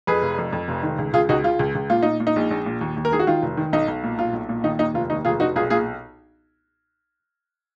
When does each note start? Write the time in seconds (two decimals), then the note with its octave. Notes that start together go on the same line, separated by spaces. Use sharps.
0.07 F2 G#4 B4
0.22 F1
0.38 F2
0.52 F2
0.68 F1
0.83 D#3
0.98 C#2
1.13 C#2 F4 G#4
1.29 C#2 D#4 F#4
1.44 C#3 F4
1.59 C#2
1.75 C#2
1.90 A#2 F4
2.03 A#2 D#4
2.20 A#2
2.27 D#4
2.36 A#1
2.51 A#1
2.66 A#2
2.81 D#2
2.97 D#2
3.05 A#4
3.12 D#3 G#4
3.19 F#4
3.27 D#3 F4
3.42 F1
3.57 D#3
3.73 B1 D#4
3.88 B1
4.03 A#2
4.18 B1 F4
4.33 B1
4.49 A#2
4.64 D#3 D#4
4.79 D#2 D#4
4.94 F1 F4
5.10 D#2 D#4
5.25 F1 F4 G#4
5.40 F1 D#4 F#4
5.56 B1 F4 G#4
5.70 A#2 F4 G#4